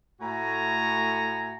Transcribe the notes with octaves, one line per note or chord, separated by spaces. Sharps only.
A2 A3 F#4 G#5 A#5